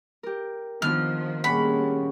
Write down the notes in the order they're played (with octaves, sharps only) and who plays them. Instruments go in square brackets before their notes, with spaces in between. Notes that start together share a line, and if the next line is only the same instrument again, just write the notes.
[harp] G4 A#4
[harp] D#3 B3 D4 [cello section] F3 [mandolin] F6
[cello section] A#2 G3 G#3 [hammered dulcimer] C#3 C#4 G4 [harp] F#5 [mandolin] B5